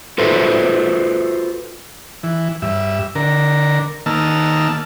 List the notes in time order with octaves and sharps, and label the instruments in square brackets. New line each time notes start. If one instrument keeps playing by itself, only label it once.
[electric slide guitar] F4 F#4 A4 B4 C5 E5
[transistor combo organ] E3
G2 E5
D3 A#4
D#3 A#3 A5 E6 F6